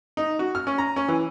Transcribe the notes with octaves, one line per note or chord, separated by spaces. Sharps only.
D#4
F#4
F6
C#4
A#5
C#4
E3